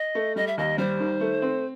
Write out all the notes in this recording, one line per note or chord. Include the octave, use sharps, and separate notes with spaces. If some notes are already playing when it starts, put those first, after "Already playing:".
Already playing: D#5
A3
G3 D#5
E5
D#2 D#5
G3 C5
D#3
A3
C4